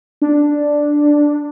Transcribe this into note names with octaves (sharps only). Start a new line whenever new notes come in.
D4